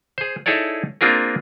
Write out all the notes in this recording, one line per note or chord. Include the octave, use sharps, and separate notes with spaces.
G#4 C5
D#4 E4 G#4 A4 C#5 D5
A#3 C4 D4 F4 G#4 A#4